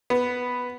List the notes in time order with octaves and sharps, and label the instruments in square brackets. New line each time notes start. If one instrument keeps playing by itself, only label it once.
[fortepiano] B3